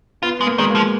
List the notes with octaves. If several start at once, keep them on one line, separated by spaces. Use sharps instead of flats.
B3 F4
G#3 B3
A#3
D#3 G#3
A#3
F3